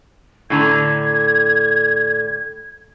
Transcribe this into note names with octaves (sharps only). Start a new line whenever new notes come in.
A2 D3 A#5 G#6